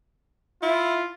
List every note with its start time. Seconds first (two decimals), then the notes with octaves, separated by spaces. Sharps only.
0.63 E4 F4